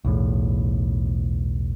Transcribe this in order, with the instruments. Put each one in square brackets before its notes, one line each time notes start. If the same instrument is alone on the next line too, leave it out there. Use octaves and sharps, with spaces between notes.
[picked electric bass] B1 E2 A2